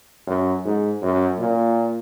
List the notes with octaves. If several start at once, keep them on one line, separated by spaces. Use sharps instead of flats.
F#2
G#2
F#2
A#2